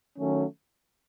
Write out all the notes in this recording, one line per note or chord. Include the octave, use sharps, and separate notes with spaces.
D#3 F#3 A3 C#4